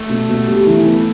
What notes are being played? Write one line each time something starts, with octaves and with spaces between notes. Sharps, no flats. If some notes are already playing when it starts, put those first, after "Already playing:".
Already playing: A3
B2
B2
G3
E3
B3